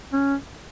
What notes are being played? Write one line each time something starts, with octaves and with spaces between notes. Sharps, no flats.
C#4